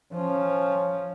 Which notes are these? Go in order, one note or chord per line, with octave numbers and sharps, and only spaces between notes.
F3 C#4